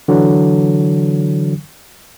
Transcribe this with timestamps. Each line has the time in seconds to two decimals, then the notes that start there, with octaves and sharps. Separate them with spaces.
0.08 D3 E3 F#3